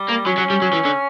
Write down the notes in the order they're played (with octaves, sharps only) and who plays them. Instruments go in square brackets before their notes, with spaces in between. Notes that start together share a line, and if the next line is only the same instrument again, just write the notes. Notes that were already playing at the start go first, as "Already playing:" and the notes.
Already playing: [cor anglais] G3
[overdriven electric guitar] A#3
[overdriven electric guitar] F#3 [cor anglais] C#4
[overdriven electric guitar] F#3
G3
F#3
E3
D3